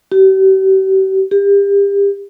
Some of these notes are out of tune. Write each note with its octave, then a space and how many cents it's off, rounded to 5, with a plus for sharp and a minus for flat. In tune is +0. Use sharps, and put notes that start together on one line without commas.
G4 -40
G4 +35